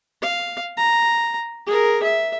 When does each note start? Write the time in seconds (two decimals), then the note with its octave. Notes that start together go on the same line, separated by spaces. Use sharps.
0.22 F5
0.77 A#5
1.67 G#4 A#4
2.03 E5